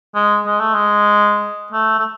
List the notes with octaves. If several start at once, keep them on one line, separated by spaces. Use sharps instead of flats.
G#3
G#3
A3
G#3
A3
A3